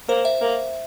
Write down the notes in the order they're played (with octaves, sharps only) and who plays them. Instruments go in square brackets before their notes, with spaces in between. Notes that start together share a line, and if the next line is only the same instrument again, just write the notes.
[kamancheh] A#3 [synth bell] C5
[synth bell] E5
[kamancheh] A#3